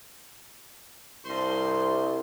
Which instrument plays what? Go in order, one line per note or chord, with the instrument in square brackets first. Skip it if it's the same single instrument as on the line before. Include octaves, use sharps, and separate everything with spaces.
[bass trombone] C2 [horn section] G2 C5 C6